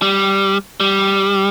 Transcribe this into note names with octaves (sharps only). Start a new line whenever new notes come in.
G3
G3